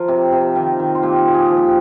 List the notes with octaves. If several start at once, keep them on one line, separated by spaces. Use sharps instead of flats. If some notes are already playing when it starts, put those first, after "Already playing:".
Already playing: F3 A#4
C3
C3
D#3
D#3
F4
A#2 G4
A#2
G#4
F3
G4